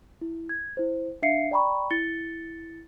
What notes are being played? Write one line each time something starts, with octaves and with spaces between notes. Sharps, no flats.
E4
G#6
E4 C5
D4 E5 F5 C7 C#7
D5 G5 A#5 B5 C#6
E4 A6 C#7 G7